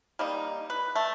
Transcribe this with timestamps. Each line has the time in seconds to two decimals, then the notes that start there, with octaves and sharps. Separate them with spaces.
0.19 G3 A#3 D#4
0.70 B4
0.95 A3